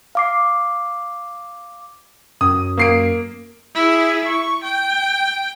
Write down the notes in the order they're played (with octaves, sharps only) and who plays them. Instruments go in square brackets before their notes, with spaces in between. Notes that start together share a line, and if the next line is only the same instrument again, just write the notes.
[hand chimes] F5 D6 C7
[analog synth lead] F#2 [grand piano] D#6
[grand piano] A#3 C7 D7
[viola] E4 G#4
C#6
G5